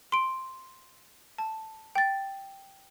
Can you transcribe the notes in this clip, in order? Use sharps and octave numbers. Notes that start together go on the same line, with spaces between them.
C6 D7
A5
G5 A6